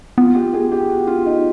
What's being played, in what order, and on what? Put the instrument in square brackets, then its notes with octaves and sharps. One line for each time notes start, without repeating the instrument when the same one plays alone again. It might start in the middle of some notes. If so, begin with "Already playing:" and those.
[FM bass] B3 [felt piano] F4
[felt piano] G4
G#4
G4
F#4
F4
D#4